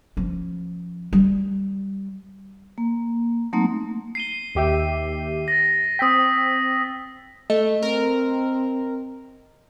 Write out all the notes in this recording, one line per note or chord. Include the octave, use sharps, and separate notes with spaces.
F3 C#4
G3
A#3
F#3 A3 A#3 C4 D#4
C7 D#7 G7
D#2 G4 E5
A6 A#6
C4 G5 D#6 E6 B6
A3 D#5
C4 A#4